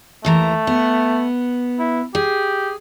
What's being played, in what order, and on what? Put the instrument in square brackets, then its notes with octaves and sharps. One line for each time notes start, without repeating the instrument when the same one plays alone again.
[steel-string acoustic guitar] D#2 E3 A#5 [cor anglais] A3
[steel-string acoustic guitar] B3
[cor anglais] E4
[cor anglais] G4 [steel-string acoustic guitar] G#4